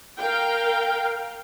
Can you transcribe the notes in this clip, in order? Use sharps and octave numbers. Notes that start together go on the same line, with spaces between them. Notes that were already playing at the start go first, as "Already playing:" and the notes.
A#4 F5 G5